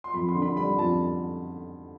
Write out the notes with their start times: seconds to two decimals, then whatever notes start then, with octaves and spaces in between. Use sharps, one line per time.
0.04 C6
0.14 F2 B5
0.29 C6
0.35 D3
0.42 B5
0.57 G3 B5
0.78 F2 A5